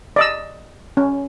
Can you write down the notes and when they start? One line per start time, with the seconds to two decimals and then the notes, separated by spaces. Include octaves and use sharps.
0.16 D5 D#5 E6
0.97 C#4